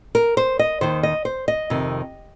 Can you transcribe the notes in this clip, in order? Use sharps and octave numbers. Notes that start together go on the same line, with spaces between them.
A#4
C5
D#5
D#2 D#3 C5
D#5
C5
D#5
F2 C3 D#3